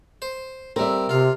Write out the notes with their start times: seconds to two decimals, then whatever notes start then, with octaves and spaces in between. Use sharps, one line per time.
0.22 C5
0.76 G3 C4 A#4 E5
1.09 C3 F4 F5